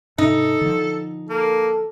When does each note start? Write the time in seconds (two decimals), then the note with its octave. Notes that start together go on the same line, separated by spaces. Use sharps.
0.18 G#2 C3 D#4 A4
0.61 D3 F3
1.30 A#3 A4